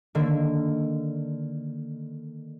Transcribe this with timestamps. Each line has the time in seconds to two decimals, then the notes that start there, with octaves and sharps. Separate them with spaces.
0.15 D3 D#3 A#3